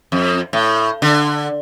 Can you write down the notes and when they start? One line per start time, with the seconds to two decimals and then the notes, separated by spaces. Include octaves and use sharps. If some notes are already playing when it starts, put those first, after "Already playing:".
0.12 F2
0.53 A2
1.02 D3